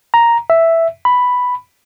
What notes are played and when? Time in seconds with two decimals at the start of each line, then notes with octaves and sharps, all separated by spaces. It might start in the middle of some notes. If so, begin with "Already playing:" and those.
0.14 A#5
0.50 E5
1.05 B5